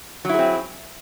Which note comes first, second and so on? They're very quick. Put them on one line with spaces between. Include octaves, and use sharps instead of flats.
F#3 E4 G#4 C4